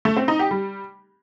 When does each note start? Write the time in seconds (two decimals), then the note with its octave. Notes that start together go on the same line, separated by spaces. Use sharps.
0.05 A3
0.17 C4
0.28 D#4
0.39 G4
0.51 G3